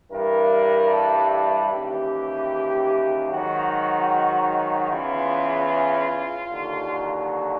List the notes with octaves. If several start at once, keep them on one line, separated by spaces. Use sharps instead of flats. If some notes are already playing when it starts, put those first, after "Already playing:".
G2 E3 G3 A#4
A4
A4
D#2 C#3 E3 G4
G#2 D#3 F#3 F#4
E2 C#3 E3 F4
D#2 D3 F#3